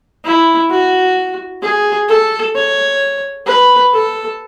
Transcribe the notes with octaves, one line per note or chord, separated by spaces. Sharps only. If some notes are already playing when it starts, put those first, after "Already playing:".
E4
F#4
G#4
A4
C#5
B4
A4